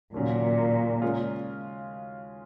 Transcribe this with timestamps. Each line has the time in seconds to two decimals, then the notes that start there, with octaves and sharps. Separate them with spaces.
0.14 D#2 A#2 C#3 F#3
1.02 C#3 G#3 C#4 F4